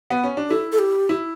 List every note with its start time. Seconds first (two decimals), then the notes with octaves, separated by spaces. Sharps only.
0.10 B3
0.23 C#4
0.37 D4
0.49 E4 A4
0.72 A4
0.79 G4
1.09 E4